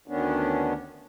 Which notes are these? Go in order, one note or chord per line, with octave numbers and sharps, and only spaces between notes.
D2 D#3 B3 C#4 D4